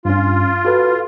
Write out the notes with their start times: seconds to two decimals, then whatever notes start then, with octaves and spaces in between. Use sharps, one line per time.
0.05 G2 C#4 F4
0.65 F#4 A4 B4